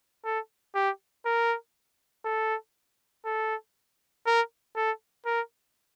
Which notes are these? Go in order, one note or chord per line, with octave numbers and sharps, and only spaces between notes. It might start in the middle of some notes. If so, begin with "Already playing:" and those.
A4
G4
A#4
A4
A4
A#4
A4
A#4